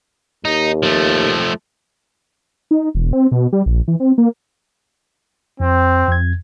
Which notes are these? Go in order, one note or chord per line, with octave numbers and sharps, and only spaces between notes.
D#2 D#4
F3 A3
D#4
E1
C4
B2
G3
A#1
E3
C4
A#3
F2 C4
F2 G#6